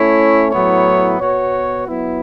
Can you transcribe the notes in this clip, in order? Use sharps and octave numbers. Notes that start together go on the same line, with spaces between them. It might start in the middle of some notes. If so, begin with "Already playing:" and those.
Already playing: A3 C#4 E4 C#5
A2 F#3 B3 E4 C#5
B2 B3 F#4 C#5
F#3 B3 E4